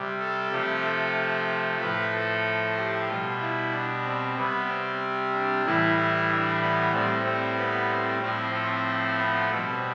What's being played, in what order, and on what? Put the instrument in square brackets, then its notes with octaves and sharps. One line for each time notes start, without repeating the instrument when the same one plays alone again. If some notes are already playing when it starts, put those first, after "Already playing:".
Already playing: [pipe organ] C3 G3
A4
C3 F3 A3 G4
A4
A2 F3 A3 B4
A4
G4
B2 G3 F4
E4
D4
C4
C3 G3 B3
C4
D4
A2 E3 G3 E4
E4
D4
B3
A2 G3 C4
C4
B3
C4
A2 F3 A3 C4
C4
B3
B2 G3 C4